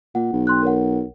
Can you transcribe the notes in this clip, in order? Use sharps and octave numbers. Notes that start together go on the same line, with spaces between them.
A#2 F#5
B1
G5 C6 F#6
A#4 C#5 F#5